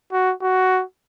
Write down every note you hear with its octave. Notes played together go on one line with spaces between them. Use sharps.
F#4
F#4